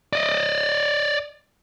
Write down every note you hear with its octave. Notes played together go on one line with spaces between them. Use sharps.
D5 D#5